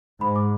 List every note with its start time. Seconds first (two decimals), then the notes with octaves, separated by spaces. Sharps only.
0.21 G#2 B5
0.36 D6